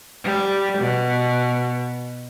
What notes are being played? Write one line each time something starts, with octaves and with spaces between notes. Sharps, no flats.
G3
B2